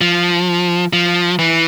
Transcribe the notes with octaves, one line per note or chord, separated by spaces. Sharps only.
F3
F3
E3